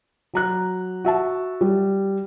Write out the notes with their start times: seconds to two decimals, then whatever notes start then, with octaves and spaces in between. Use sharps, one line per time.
0.34 F#3 A#5 F#6
1.05 F#4 E5 A5
1.61 G3